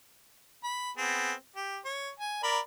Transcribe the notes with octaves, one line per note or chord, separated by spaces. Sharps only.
B5
B3 C4 G#4
G4
C#5
G#5
A#4 D5 B5